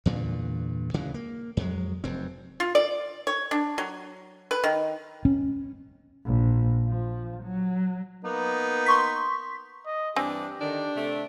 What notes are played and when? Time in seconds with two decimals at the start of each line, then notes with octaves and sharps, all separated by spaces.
0.06 E2 G2 A#2 D3
0.94 D2 C#3 E3 G#3
1.14 A#3
1.57 F2 F#3 G#3
2.04 F1 F#2 C4
2.60 F4
2.75 D5
3.27 C#5
3.51 D4
3.78 F#3
4.51 B4
4.64 D#3
5.25 C#4
6.26 A#1
6.87 F3
7.43 F#3
8.25 A#3 B3 D#4
8.86 C6 C#6 B6
9.86 D#5
10.16 G2 E3 C4 D4 G4 G#5
10.61 D3 D#3 D4
10.96 C3 A3